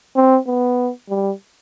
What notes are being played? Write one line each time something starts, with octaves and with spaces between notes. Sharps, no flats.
C4
B3
G3